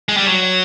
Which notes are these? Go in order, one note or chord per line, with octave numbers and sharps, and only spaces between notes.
G#3
G3
F#3